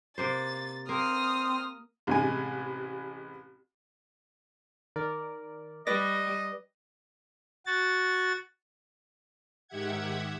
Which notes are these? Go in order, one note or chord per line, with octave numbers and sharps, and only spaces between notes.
C3 A#3 C5 A6
A#3 C4 D#6 F6
A1 C3 G#3 G#5
D#3 A#4 D5
G3 B4 D5 D#5 A#6
F#4 A6
G#2 D#3 G4 E5 F#5 G#6